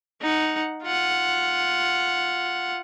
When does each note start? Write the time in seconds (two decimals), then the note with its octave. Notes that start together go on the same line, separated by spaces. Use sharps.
0.21 D#4 F#5
0.83 F4 F#5